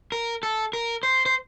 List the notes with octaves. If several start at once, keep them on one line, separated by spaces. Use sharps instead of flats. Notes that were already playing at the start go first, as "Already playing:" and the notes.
A#4
A4
A#4
C5
C5